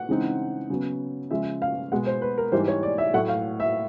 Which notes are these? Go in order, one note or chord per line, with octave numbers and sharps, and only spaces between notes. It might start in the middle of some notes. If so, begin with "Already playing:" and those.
Already playing: F#5
C#3 E3 G#3 C4 D#4
C#3 F#3 B3
C#3 F3 G#3 E5
F5
B2 G#3 B3 F#5
C5
B4
A#4
G#2 E3 G3 C5
C#5
D5
E5
A2 F#3 A3 F#5
F5
E5